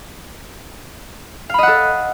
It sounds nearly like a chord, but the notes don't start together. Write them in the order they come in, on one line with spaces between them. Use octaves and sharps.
F5 B5 D#5 F#5 A4